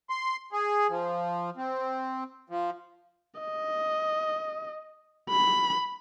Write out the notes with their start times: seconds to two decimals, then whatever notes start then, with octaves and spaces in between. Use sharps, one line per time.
0.10 C6
0.52 G#4
0.89 F3
1.57 C4
2.50 F3
3.41 D#5
5.30 B5